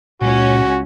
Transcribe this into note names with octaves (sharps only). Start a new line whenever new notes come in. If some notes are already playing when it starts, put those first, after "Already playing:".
C#2 A#2 C#4 F#4